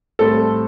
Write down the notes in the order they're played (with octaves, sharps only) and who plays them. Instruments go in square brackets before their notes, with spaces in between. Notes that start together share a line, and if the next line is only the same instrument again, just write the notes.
[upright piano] A2 G3 C4 [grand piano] A4